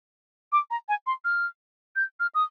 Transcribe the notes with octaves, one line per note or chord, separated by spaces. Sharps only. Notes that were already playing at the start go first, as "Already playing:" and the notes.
D6
A#5
G#5
C6
F6
G6
F6
D#6